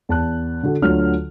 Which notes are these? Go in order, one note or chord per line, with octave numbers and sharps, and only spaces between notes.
E2 A5 F#6
D3 F#4 A4
D2 D3 F#3 F4 F6